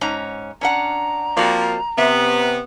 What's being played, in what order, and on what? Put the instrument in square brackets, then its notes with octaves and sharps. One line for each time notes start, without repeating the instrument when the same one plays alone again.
[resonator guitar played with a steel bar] G#2 C#4 A#5
[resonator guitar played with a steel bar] C#4 D4 F#5 [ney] A#5
[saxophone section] F3 A#3 [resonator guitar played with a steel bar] C4 F#4 D5
[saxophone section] C3 B3 [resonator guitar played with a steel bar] E5